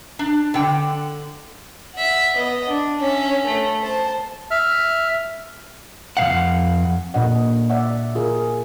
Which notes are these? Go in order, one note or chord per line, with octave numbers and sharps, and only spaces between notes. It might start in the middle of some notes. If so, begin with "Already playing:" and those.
D4
D3 G5
E5 F#5
B3 D#5
D4
C#4 E5
A3
C5 A5
E5 F6
F2 E3 F5 F#5
A#2 D4 F4 A4 D#5 F#5
D5 E5 F#5
F4 G#4 A#4